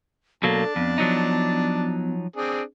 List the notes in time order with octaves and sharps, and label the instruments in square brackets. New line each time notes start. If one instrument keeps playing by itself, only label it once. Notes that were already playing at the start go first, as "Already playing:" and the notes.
[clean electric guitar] B2 F#3 A#3 [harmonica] D4 A5 [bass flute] A4
[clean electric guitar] F2 [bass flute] B3
[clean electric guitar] F3 F#3 D#4
[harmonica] C4 D4 G#4